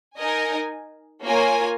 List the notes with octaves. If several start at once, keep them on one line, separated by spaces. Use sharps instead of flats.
D#4 A#4 D#5 G#5
A#3 F4 A#4 C#5 G#5